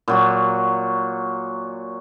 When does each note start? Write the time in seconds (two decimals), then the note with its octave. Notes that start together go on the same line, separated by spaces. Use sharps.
0.08 A#2 F#3 F#4